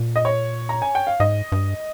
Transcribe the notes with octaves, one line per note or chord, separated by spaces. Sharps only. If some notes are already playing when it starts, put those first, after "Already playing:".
Already playing: A#2
D#5
C#5
A#5
G#5
G5
F5
G#2 D#5
G2